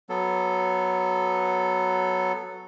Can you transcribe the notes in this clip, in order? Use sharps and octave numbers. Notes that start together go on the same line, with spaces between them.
F#3 B3 A4